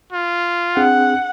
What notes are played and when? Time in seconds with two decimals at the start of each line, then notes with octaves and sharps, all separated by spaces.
0.12 F4
0.77 C4 D4 G#4 F#5